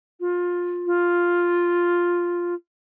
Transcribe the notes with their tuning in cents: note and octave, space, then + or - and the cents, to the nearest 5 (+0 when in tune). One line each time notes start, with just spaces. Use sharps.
F4 +20
F4 +0